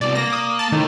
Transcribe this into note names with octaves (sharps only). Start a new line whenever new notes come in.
C2 B2 D5
A#3 A#6
D#6
A5
A2 D#3